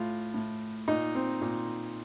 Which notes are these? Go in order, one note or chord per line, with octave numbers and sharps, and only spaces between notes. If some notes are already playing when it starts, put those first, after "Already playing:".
Already playing: A2 F4
A2
A#2 D#4
C4
A#2